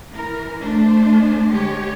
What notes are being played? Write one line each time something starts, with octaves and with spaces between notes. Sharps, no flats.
E3 A#4
A3 D4 C5
D3 G#3 G4 C#5